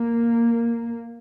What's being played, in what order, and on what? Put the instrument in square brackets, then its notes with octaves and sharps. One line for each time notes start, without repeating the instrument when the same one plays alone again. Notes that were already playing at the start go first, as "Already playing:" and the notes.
Already playing: [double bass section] A#3